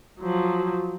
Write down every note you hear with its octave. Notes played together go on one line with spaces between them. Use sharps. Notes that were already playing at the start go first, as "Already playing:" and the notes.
F3 F#3